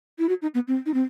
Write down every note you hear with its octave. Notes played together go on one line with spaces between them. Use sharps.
E4
F#4
D#4
B3
C4
D#4
C4